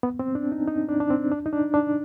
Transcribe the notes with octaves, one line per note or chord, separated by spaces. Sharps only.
B3
C4
D4
D#4
D#4
D4
D4
C4
D4
D#4
D4
D4